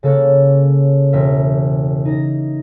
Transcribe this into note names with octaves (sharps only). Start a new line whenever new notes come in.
C#3 A#3 A4 C#5 A5 F#6
E1 A#4 E5
D#4 A#6